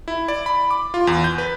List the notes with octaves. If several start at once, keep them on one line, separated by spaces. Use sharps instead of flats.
E4
D5
B5
D6
F4
E2
G6
B4